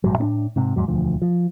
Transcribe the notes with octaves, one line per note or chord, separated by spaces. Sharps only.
A#1 G#2 F#3
A2 C4 D4
G#2 C3
E2 G#2 F#3
E1 D2 F3
F3